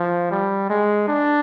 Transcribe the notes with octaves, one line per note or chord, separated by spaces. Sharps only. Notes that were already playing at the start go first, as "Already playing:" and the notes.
Already playing: F3
G3
G#3
D4